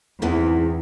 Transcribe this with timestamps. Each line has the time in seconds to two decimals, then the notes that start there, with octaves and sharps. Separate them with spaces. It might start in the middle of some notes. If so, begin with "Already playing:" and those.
0.22 E2 G#2 C3 E3